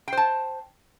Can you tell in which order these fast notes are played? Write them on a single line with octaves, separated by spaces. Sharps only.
G5 C5 A5